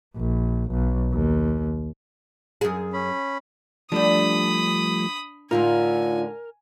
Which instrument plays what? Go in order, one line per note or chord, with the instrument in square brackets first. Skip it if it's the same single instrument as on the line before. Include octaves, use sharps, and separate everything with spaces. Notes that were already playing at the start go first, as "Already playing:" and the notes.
[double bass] A#1
B1
D#2
[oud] F#2 G#4
[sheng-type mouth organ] C#4 B5
[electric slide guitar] F3 G3 A3 [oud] D4 G4 [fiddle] B5 D#6
[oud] A2 D3 D#4 [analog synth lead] F4 [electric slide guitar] A#4 [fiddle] G#5